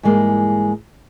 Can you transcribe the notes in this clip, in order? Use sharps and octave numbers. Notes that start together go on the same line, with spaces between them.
G#2 E3 G3 G#3 A#3